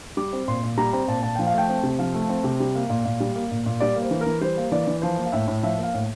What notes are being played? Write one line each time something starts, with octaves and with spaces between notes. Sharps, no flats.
G3 D6
C4
A#2 C6
A#2
G3 A#5
C4 A#5
A#2 A5
A#2 A5
F3 G5
F5
A3 G5
C4
C3
F3 F5
A3
C4
C3
G3
A#3
A#2
A#2
G3
A#3
A#2
A#2
G3 D5
A#3
C5
E3
A#4
E3
G3 C5
A#3
E3 D5
E3
F3 C5
A#3
F5
A2 E5
A2
F3 E5
A#3
F5
A2